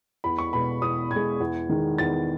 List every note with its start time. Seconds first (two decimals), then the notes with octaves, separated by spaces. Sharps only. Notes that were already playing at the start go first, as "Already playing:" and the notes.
0.24 E2 B5
0.38 C#6
0.53 B2 G#3 B5
0.82 E2 D#6
1.11 B2 G#3 G#6
1.40 E2
1.69 D#3 G#3
1.98 E2 A6